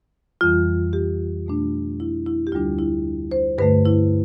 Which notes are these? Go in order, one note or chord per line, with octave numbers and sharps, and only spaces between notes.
F2 E3 G3 F4
G4
B2 A3 D4
E4
E4
G4
D2 D3 G3 D4 F4
E4
C5
G2 D3 A3 B4
E4